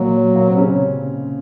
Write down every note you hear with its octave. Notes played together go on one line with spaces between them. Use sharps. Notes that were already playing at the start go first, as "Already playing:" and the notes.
Already playing: A#2 F#3 A#3
A#2 A#3
C3 C4
C#3 C#4